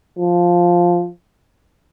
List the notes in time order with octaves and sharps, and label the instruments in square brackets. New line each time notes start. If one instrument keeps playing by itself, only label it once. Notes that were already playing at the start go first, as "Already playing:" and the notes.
[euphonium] F3